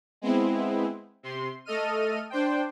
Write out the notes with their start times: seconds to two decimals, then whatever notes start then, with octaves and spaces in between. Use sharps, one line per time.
0.22 G#3 B3 C4 E4
1.23 C3 C6
1.65 A3 A4 D#5 F6 D#7
2.30 D4 C5 G5